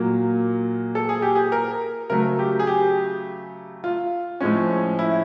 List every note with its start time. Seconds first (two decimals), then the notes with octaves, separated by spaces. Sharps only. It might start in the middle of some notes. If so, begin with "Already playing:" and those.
Already playing: A#2 F#3 A#3
0.95 A4
1.09 G#4
1.22 G4
1.35 G#4
1.52 A#4
2.10 C#3 F#3 A3 A#4
2.39 G4
2.59 G#4
2.67 G4
3.84 F4
4.40 A2 F3 G#3 C#4
4.99 E4